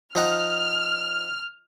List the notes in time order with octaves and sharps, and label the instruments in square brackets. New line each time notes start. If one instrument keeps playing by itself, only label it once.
[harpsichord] F3 D#4 F#5 [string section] F6